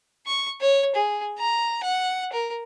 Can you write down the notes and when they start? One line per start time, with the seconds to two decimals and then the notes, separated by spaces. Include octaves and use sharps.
0.27 C#6
0.61 C#5
0.95 G#4
1.39 A#5
1.83 F#5
2.33 A#4